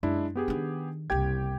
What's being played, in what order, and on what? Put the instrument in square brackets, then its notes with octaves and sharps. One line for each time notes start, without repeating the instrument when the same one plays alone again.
[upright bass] F#2 [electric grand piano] G#3 D4 E4
[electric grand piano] B3 G4 G#4
[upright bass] D#3 D4
[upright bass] F#1 C2 [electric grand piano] G4 G5 G#6